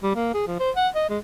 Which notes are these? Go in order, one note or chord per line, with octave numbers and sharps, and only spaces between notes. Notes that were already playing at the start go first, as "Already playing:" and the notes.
G3
A#3
G#4
F3
C5
F#5
D#5
G#3